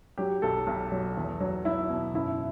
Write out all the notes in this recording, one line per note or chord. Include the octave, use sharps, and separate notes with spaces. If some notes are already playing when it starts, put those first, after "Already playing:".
F#3 G4
B1 A4
B1
F#3
E2
F#3
F#3 E4
B2
F#1 E4